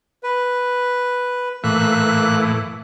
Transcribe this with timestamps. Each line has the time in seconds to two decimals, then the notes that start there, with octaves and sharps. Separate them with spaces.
0.23 B4
1.64 A2 E3 A#3 F#6